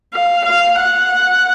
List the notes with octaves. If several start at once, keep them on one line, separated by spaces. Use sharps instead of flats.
F5
F5
F#5